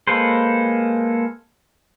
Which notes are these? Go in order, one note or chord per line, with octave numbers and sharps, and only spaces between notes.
G#3 A#3 A4 B4 C5